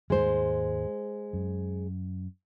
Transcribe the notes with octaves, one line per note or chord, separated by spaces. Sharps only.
D#2 G#2 G#3 C5
F#2